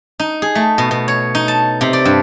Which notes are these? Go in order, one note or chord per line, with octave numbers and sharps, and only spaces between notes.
D#4
G#4
A3
B2
B2
C#5
D#4
A5
C3
D5
G2